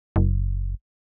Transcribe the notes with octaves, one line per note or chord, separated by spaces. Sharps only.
F#1